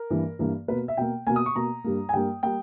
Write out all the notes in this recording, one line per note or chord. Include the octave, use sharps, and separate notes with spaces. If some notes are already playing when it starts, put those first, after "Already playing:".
Already playing: A#4
G2 E3 A#3
G2 E3 A#3
B2 A#3 B4
E5
B2 A#3 G5
B2 A#3 G#5
D#6
C#6
B2 A#3 A#5
G2 G3 A#3
G#5
G2 G3 A#3 G5
G3 A#3 G5